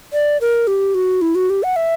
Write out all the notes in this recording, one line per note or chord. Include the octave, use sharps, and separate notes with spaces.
D5
A#4
G4
F#4
E4
F#4
G4
F#5
E5